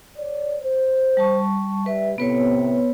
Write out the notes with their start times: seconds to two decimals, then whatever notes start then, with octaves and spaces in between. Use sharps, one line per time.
0.18 C#5 D5
0.62 C5
1.17 G3 A5 C#6
1.86 G3 B4 E5
2.18 A2 C3 B3 B4 C#5